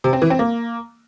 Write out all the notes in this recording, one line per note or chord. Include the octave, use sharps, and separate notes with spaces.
C3
C4
E3
C4
A#3